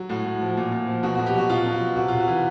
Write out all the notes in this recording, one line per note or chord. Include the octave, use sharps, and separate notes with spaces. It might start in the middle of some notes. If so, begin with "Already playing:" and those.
Already playing: F#3
A2 F#4
A2
F3
A#2
A#2
F3
B2 F#4
F#4
B2
G4
F#3 F#4
B2 F4
B2
F#4
F#3
C3 F#4
C3 F4
F#4
E3